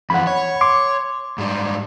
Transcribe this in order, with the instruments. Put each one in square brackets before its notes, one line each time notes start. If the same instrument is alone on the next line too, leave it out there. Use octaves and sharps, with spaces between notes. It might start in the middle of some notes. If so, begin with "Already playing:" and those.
[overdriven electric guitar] F2 E3 [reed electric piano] F#5 B5
[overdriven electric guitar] C#5
[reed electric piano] C6 D6
[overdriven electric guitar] G#2 G3